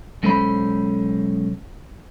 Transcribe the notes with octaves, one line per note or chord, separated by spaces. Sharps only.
B1 G#3 C#4 A4 C5 B5